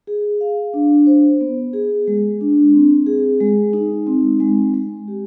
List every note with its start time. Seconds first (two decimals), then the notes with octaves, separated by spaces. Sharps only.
0.07 G#4
0.41 F5
0.74 D4
1.07 C5
1.41 B3
1.73 G#4
2.08 G#3
2.41 D4
2.74 C4
3.07 G#4
3.40 G#3
3.73 D#4
4.07 C4
4.40 G#3
4.74 G#3
5.08 G4